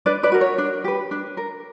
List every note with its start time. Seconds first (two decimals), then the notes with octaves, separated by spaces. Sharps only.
0.06 D4 B4 D5
0.23 B4 D5
0.32 F#4 A#4
0.41 C#5
0.58 D4
0.84 G4 B4
1.11 D4
1.37 A#4